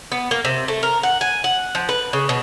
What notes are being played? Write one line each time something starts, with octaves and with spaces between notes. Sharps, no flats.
B3
A#3
C3
A3
A#4
F#5
G#5
F#5
F3
B4
C#3
B2